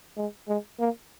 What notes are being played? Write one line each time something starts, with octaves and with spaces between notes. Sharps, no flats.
G#3
G#3
A#3